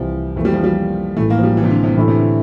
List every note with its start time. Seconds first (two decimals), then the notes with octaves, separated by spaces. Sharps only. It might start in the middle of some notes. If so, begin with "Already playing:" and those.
Already playing: C2 C3 E3 F3
0.36 F2 E3 A3 A#3
0.45 G3
0.54 F3
0.64 G3
1.16 A1 A2 E3 A3
1.30 A#3
1.38 F3
1.43 G3
1.57 E3
1.64 C3
1.70 D3
1.84 C3
1.96 A2 D3 E3 A3 E4
2.08 C3
2.18 D3